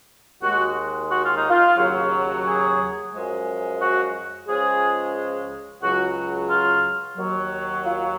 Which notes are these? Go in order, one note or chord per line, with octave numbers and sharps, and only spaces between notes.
D#2 D#3 G#3 F#4
F#4
F4
D#4
F4
D#2 C#3 F#3
G#4
F#2 F3 G#3
F#4
C#2 C#3 F3 G#3 G#4
C#2 C#3 F#3 F#4
F4
D#2 D#3 F#3
F4